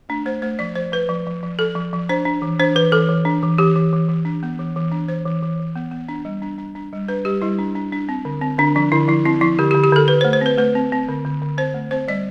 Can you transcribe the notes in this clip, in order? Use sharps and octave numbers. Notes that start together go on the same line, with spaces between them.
A3 D4
A3 C5
A3 C5
F3 D5
F3 C5
F3 B4
F3
F3
F3
F3 A4
F3
F3
D4 C5
D4
E3
D4 C5
E3 B4
E3 A4
E3
D4
E3
E3 G4
E3
E3
E3
D4
B3
E3
E3
D4
E3 C5
E3
E3
E3
B3
B3
D4
G3
D4
D4
D4
G3
D4 B4
G3 G4
G3 E4
D4
D4
D4
C4
D3
C4
D3 D4
F3 D4
D3 E4
F3 E4
C4 E4
F3 E4
D3 G4
D3 G4
G4
D3 A4
D3 B4
C5
A3
C5
C4 B4
A3 B4
C4
C4
D3
D3
D3
C4 C5
A3
C4 C5
G3 D5